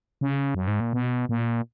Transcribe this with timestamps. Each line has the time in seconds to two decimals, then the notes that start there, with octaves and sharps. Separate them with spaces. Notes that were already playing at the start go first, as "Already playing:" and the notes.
0.21 C#3
0.55 F#2
0.68 G#2
0.80 A#2
0.93 B2
1.29 A#2